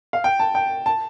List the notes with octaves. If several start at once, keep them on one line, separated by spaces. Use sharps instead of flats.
F5
G5
A5
G5
A5